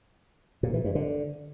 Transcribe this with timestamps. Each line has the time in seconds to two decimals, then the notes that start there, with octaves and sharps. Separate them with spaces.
0.63 A#2
0.74 E3
0.84 G2
0.95 D3